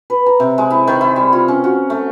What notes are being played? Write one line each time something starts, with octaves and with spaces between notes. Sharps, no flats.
B4
A#5
C3
G#3
E4
D#3
E4
G3
F4
C#4
F#4
A3